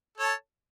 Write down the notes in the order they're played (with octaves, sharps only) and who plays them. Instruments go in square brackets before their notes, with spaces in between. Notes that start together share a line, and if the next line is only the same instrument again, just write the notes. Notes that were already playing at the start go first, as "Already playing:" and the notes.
[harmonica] A4
C#5
A5